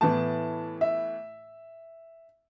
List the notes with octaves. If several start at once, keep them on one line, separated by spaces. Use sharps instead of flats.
A2 E3 B3 A5
E5